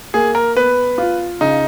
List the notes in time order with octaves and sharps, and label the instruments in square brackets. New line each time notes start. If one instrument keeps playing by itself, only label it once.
[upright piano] A#3 [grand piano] G#4
[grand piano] A#4
[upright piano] B3 [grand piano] B4
[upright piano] F4
[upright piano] C#3 [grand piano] D#4